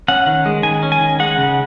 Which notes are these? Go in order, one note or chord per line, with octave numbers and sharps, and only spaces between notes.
C#4 F#5
D#3
G#3
D#3 G#5
C#4
G#5
D#3
G#3 F#5
C#3